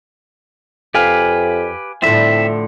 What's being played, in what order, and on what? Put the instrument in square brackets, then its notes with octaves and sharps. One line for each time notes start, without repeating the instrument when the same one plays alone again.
[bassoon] F2 [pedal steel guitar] G4 B4 [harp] F5 G#5
[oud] A2 D3 F3 [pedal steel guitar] C4 E5 [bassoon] E4